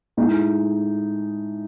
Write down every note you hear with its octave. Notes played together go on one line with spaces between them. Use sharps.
A2 G#3 D#4